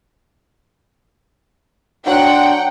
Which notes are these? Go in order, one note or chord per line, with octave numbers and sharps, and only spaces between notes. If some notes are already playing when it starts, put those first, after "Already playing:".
F#3 D4 F#4 F#5 G5 C6